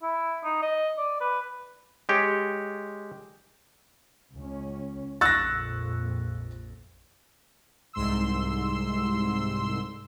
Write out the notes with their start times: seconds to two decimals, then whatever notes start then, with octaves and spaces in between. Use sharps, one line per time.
0.03 E4
0.44 D#4
0.62 D#5
0.98 D5
1.21 B4
2.09 G#3 G4 C#5
4.36 C#2 C#4
5.21 A#1 F2 C#6 E6 F#6 A6 A#6
7.93 C2 G#2 C6 E6